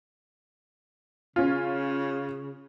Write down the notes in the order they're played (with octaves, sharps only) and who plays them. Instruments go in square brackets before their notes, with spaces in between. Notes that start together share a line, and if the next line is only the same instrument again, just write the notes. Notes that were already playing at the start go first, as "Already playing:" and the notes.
[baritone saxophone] C#3 [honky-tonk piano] C#4 F4